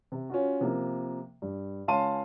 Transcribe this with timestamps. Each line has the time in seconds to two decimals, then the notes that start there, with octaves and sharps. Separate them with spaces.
0.12 C3
0.30 C#4 F4 F#4
0.61 C3 F3 A#3
1.42 G2
1.88 C#2 C#4 F5 A5 C6 D#7